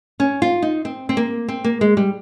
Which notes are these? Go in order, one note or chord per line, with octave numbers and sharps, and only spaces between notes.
C#4
F4
D#4
C4
C4
A#3
C4
A#3
G#3
G3